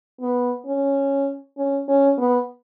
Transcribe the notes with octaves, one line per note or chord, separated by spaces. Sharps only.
B3
C#4
C#4
C#4
B3